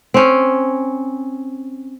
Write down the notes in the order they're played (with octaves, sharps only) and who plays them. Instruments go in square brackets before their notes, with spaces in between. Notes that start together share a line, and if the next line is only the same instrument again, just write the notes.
[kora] C4 C#4